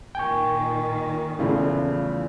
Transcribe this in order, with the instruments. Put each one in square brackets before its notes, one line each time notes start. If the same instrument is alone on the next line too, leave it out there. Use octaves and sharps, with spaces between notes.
[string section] A#2 D#3 [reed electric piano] G5 G#5 C#6
[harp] E2 E3 F3 [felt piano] A2 C#3 A4